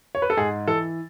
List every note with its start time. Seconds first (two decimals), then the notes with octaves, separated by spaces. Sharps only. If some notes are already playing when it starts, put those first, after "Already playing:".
0.15 C#5
0.22 B4
0.30 A4
0.37 G#2 G#4
0.67 E3 A4